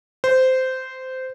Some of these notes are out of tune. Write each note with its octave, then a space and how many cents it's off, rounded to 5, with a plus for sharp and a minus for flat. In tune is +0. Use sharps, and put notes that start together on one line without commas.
C5 -15